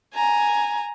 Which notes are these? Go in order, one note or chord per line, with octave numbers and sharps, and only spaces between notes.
G#5 A#5